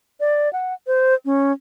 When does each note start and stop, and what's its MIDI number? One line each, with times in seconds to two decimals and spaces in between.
0.20 0.52 74
0.53 0.74 78
0.87 1.14 72
1.25 1.52 61